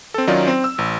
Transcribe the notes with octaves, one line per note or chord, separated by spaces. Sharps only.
C4 A4
D#3 F#3 C#4 D#4 F4 D5
C4
E6
A1